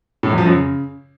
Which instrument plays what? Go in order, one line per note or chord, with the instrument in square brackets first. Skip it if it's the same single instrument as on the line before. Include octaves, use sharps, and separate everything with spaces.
[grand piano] A2
E2
F3
F#2
C#3